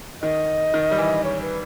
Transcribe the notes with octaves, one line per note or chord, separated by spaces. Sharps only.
D#3 D#5
D#3
G3
E3
C#5
B4